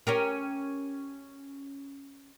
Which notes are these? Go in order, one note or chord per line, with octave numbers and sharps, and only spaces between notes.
C#4 G4 A#4